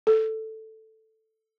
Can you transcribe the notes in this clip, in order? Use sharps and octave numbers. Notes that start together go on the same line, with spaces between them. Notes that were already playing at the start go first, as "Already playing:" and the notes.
A4